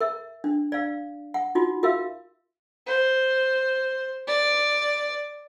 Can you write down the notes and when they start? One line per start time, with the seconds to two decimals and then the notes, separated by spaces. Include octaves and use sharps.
0.01 A#4 E5
0.44 D4
0.72 D5 F5
1.34 F#5
1.55 D#4 F4 F#4
1.83 F#4 A#4 E5 F5
2.86 C5
4.28 D5